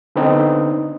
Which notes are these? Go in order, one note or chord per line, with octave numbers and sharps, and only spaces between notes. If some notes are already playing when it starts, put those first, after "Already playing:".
D3 B3 C4 D#4